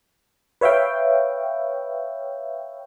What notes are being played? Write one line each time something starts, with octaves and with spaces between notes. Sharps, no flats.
B4 C#5 E5 F5 G5